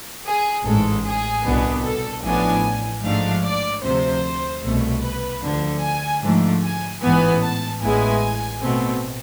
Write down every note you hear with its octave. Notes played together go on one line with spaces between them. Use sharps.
G#4
A1 G#2 G#3 A4
G#4
C2 B2 B3 D4
A4
A1 A2 F3 B3 D4 G#5
G#2 F3 A3 D4 F5
D5
D2 C3 F3 C5
C2 B2 A3
B4
D2 D3 F3
G#5
G#2 F3 A3 D4
G#5
A1 G#2 E3 B3 G#5
A5
A1 A2 G#3 B3 E4 G#5
B2 A3 C4